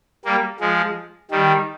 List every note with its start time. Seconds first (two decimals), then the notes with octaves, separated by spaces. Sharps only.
0.25 G3 A#3
0.60 F3 G#3
1.31 D#3 G3